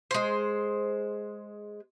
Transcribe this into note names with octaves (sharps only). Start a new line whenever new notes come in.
G#3 C5